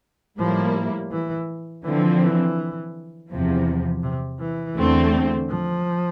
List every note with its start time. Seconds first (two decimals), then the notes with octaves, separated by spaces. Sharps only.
0.38 A2 F3 G3 A#3 E4
1.12 E3
1.84 D3 E3 F3 C4
2.21 E3
3.29 E2 C3 F3
4.03 C3
4.40 E3
4.76 E2 D3 A3 C4
5.49 F3